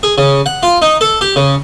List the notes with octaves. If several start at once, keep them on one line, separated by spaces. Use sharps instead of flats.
G#4
C#3
F#5
F4
D#4
A4
G4
C#3